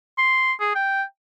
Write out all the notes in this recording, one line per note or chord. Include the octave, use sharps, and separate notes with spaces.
C6
G#4
G5